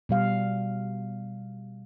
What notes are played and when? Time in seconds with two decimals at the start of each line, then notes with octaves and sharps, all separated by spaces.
0.09 B2 G3 F5